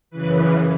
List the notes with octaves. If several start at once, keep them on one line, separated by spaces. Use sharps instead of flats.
F#2 C#3 E3 B4